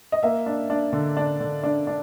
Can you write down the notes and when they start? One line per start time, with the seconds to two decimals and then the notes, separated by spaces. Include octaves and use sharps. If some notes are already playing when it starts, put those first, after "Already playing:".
0.12 D#5
0.23 A#3 E5
0.46 D4
0.70 D4
0.93 D3
1.17 D4
1.40 D3
1.63 D4
1.87 D4